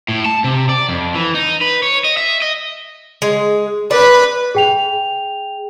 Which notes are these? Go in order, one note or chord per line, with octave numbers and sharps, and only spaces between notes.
A2
A5
C3
D5
F2
E3
D#4
B4
C#5
D#5
E5
D#5
G#3
B4 D5 B5
G#4 G5 F7